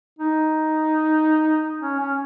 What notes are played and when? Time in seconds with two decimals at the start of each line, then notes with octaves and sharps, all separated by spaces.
0.19 D#4
1.81 C#4
1.99 C#4